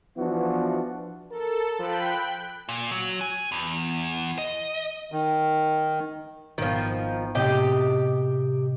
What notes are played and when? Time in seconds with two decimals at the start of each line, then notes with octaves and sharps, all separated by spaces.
0.17 E3 F3 B3 D4 E4 F#4
1.31 A4 A#4
1.79 F3 G5 B5 F#6
2.69 A#2
2.91 F#3
3.21 G#5
3.52 E2
4.38 D#5
5.12 D#3
6.58 G#1 D#3 F3 B3
7.35 A2 C3 G4 D#5 G5